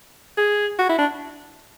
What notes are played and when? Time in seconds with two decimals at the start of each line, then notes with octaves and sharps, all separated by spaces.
0.37 G#4
0.79 F#4
0.89 E4
0.98 D4